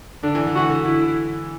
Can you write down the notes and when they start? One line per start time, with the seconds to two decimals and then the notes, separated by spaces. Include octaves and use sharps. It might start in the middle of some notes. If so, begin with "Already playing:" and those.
0.23 D3 D4
0.35 E3
0.47 D3
0.55 E3 F#4
0.70 D3
0.85 D3 E4